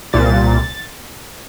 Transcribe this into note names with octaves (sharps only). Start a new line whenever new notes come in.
C2 A#2 A6